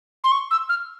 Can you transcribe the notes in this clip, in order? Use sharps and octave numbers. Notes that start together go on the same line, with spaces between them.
C6
C#6
E6
F6